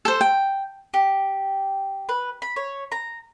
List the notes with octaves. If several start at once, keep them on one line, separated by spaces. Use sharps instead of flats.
A4 C5
G5
G4
B4
B5
C#5
A#5